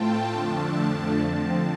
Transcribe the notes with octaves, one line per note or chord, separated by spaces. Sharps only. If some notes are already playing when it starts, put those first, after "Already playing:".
Already playing: A2 A3 C4 F4 G5 A5
F2 D3 F3 A3 D4
D3 F3 C4 A5